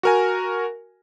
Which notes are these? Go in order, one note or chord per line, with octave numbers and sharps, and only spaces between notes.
F#4 A#4 G#5